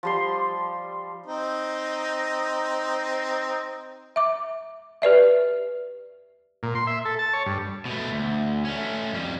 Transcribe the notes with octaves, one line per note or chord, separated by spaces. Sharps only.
F3 G3 C6
C4 D#4
E5 D6
G4 B4 D5 E5
A#2
C6
E5
A4
A5
C#5
G2
B2 A3
D2
A3 C#4
F2 G3